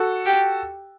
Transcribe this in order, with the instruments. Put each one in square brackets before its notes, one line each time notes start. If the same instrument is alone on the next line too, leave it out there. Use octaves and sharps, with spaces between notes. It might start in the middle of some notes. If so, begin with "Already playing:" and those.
Already playing: [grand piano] F#4 A4
[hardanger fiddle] G4